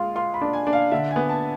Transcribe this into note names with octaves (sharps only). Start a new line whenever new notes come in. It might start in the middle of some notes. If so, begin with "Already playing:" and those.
Already playing: G#3 F4 C6
F4 C6
B5
D4
G#5
D4
F5
D3 E5
G#5
B3
A5